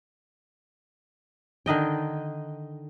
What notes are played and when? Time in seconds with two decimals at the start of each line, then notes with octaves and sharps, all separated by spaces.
1.66 D3 D#3 D#5 G5